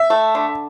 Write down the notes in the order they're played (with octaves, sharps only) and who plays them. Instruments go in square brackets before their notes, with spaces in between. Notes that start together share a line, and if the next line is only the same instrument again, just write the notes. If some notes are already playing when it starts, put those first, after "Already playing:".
Already playing: [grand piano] E5
[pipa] A3
D3